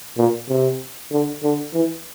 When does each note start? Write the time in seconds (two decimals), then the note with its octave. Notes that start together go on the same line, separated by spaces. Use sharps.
0.18 A#2
0.49 C3
1.11 D3
1.43 D3
1.74 E3